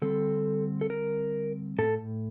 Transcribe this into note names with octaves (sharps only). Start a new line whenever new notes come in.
D3 G3 C4 A4
A4
A#4
A2 A4